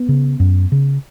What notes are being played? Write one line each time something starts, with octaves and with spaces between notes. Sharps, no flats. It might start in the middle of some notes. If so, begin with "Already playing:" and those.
Already playing: B3
C#3
F#2
C#3